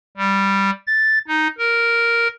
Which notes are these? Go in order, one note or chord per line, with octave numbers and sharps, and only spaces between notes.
G3
A6
D#4
A#4